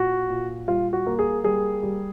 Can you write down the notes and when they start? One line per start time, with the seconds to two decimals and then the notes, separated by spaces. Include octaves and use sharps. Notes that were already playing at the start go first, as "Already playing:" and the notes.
Already playing: A#2 F#4
0.30 A#2
0.68 G3 F4
0.93 F#4
1.07 A#3
1.19 G#4
1.44 G3 G#4
1.83 G3